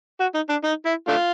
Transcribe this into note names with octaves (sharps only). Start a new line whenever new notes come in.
F#4
D#4
D4
D#4
E4
A3 D4 F4